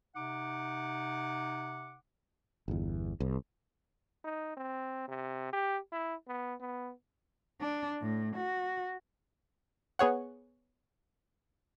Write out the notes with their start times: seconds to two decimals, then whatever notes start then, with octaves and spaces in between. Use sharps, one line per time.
0.15 C3 D#4 F#5 D6
2.68 G1 E2
3.20 C2
4.24 D#4
4.57 C4
5.08 C3
5.53 G4
5.92 E4
6.28 B3
6.60 B3
7.60 D4
8.01 A2
8.36 F#4
9.99 B3 G#4 C#5 F#5